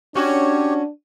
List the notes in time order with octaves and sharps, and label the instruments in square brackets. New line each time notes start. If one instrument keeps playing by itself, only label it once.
[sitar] C#4 F#4 [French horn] D4 [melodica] G4 C#5